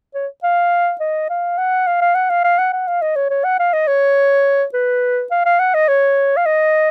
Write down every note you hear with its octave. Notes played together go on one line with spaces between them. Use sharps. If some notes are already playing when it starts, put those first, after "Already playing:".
C#5
F5
D#5
F5
F#5
F5
F5
F#5
F5
F5
F#5
F#5
F5
D#5
C#5
C#5
F#5
F5
D#5
C#5
B4
F5
F5
F#5
D#5
C#5
F5
D#5